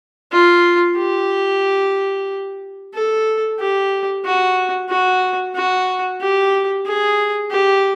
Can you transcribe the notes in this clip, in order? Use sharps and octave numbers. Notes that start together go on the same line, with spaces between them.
F4
G4
A4
G4
F#4
F#4
F#4
G4
G#4
G4